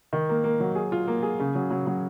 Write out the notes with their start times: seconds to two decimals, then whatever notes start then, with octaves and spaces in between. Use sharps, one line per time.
0.13 D#3
0.29 A#3
0.44 A#3
0.60 F#3
0.75 G#4
0.92 F4
1.07 A#3
1.23 G#4
1.40 C#3
1.55 F#3
1.70 F#3
1.87 F#3